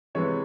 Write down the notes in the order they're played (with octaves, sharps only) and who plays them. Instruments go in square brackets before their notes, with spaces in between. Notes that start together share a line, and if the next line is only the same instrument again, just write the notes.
[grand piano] C3 E3 G#3 B3 C#5